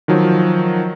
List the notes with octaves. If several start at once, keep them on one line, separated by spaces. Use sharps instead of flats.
D#3 F3 F#3